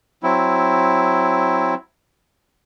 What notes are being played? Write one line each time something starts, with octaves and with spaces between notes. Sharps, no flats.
F#3 C4 E4